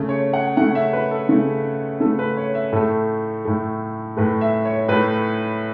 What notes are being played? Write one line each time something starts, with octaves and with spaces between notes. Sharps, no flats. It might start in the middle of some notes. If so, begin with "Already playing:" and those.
Already playing: C#3 A3
C#5
F#5
C#3 A3 F#5
E5
B4
A4
C#3 A3
C#3 A4
A3
B4
C#5
E5
A2 A3 A4
A2 A3
A2 A3 B4
E5
C#5
A2 A3 B4